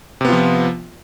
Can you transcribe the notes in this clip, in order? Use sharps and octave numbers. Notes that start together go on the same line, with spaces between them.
C3 F3 B3 F4